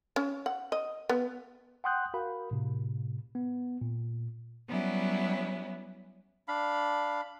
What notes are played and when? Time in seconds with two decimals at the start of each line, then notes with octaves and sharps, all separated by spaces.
0.16 C#4
0.46 F#5
0.72 D#5
1.09 B3
1.84 F#5 G5 C6 D#6 F#6 G6
2.14 F#4 A#4 F5 B5
2.51 A2 C3
3.35 B3
3.81 A#2
4.68 F#3 G3 B3 C#4 E4
6.48 D4 F5 B5